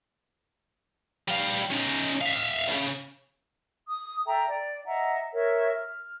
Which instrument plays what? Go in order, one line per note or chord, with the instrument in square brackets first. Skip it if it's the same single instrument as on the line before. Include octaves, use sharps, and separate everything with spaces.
[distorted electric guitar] G3 F5
C#4 D#4
E5 F5
D2 C#3
[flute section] D#6
A4 E5 G5 A#5
D5
D#5 E5 F#5 A#5
A#4 C#5 E5
F6